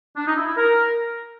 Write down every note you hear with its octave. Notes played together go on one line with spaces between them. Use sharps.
D4
D#4
E4
E4
A#4